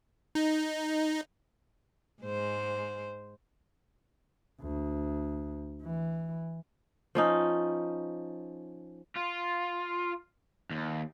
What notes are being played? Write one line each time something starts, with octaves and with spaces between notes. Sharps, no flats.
D#4
G#2 G#3 C5
D2
E3
F3 C#4 D#4
F4
D#2